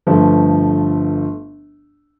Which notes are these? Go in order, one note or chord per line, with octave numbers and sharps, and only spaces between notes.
G1 G2 F3 A3